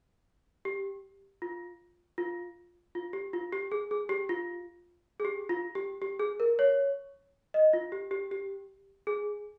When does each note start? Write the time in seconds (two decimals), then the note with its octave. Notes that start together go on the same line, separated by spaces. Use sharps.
0.65 G4
1.42 F4
2.18 F4
2.95 F4
3.13 G4
3.33 F4
3.53 G4
3.72 G#4
3.91 G#4
4.09 G4
4.29 F4
5.20 G#4
5.25 G4
5.49 F4
5.75 G4
6.02 G4
6.20 G#4
6.40 A#4
6.59 C#5
7.54 D#5
7.73 F4
7.92 G4
8.11 G4
8.31 G4
9.07 G#4